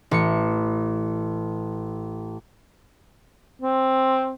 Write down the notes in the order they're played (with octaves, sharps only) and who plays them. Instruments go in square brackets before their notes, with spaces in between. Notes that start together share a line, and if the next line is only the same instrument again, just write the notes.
[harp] A1 C#7
[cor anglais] C4